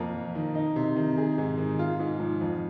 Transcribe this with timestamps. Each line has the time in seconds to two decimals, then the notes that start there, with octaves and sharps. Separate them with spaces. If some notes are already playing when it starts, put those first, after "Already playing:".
Already playing: F2 A#3
0.14 F2
0.35 D#3
0.55 D#4
0.76 C3
0.96 D#3
1.18 G#4
1.38 G#2
1.58 D#3
1.79 F4
2.00 G#2
2.20 F3
2.41 F2